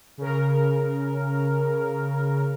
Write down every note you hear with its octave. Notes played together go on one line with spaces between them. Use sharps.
C#3 A#4